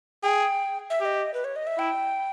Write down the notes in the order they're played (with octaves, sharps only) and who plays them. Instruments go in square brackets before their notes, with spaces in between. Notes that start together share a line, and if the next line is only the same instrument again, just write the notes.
[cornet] G#4 [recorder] G5
[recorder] E5
[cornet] G4 [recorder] D#5 E5
[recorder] B4
C#5
D#5
E5
[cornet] E4 [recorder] G5